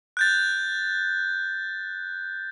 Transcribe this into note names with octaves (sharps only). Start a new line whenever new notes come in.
F#6 G6 A6